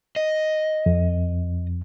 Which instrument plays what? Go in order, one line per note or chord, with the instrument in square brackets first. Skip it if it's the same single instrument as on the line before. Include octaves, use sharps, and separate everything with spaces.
[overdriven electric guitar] D#5
[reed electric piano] F2